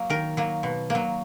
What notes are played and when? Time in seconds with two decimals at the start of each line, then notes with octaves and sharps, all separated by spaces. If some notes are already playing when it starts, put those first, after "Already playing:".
Already playing: F#3 A#3
0.10 D#3 A#4
0.37 F#3 A#3
0.63 B2
0.90 F#3 A#3